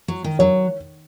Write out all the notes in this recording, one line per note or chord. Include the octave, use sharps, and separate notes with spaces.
F#3
D#3
F#3 C#5